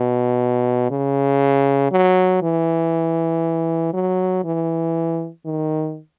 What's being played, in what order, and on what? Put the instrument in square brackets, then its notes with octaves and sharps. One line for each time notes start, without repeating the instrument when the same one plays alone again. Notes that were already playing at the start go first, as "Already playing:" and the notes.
Already playing: [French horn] B2
C#3
F#3
E3
F#3
E3
D#3